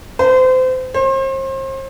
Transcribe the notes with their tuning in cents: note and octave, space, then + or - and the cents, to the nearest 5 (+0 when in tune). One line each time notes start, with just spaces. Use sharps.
C5 -30
C5 +35